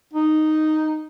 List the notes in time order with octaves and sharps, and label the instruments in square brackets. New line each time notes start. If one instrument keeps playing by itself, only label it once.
[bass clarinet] D#4